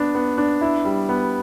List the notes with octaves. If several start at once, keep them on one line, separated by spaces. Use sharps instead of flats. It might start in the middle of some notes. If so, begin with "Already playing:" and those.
Already playing: B3 D4
B3
D4
E4
G3
B3